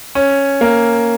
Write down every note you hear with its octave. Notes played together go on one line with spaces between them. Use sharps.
C#4
A#3